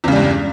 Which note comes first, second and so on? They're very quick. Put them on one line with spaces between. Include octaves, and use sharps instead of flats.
E2 C#3 G3 G2